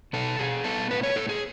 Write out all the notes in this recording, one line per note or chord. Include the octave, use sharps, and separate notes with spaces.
B2 A4
B2 G#4
B3 A4
A2 B4
C#5
A2 A4
G#4